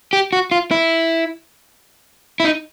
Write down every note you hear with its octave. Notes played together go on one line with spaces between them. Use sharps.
G4
F#4
F4
E4
E4
D#4